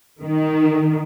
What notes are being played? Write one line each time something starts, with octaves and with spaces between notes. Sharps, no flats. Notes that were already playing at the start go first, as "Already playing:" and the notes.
D#3